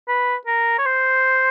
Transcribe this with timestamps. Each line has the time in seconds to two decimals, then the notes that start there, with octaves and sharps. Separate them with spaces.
0.08 B4
0.47 A#4
0.78 C#5
0.86 C5